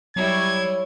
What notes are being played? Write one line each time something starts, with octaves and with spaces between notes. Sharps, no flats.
F#3 G3 E4 C#5 G#6